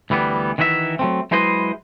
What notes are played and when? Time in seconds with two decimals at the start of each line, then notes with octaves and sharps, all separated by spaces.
0.10 D2 E3 G3 B3
0.58 D#3 E3 F#4 G#4 E5
0.99 F#3 A3 C4
1.31 F#3 G#3 E4 B4 C5 D#5